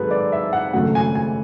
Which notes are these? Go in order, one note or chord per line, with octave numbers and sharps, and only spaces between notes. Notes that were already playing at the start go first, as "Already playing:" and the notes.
Already playing: G#1 G#2 F#3 G#4 A4 B4
D5
E5
F#5
G#1 F#2 C#3 F#3 A3 F#5
G#5
G#5